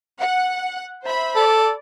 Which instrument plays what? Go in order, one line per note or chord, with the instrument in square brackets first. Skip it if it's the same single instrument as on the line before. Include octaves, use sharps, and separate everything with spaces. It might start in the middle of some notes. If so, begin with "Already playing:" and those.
[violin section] F#5
C5 E5 B5
[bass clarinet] A4 [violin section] D5